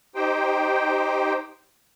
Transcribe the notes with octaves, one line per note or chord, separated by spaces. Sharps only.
D#4 G4 C5 G5